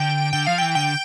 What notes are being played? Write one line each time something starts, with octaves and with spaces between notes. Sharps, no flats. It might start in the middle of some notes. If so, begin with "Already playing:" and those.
Already playing: D3 G5
D3 G5
F3 F5
E3 G5
D3 G5